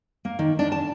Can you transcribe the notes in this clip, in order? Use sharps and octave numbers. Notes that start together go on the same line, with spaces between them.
A#3
D#3
D4
A5